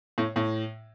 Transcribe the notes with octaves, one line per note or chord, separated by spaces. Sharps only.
A2
A2